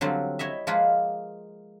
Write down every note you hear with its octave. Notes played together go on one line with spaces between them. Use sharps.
D3 F#3 G3 C4 F4
E4 C#5 D#5 E5
F3 G#3 A#3 F4 G#4 B4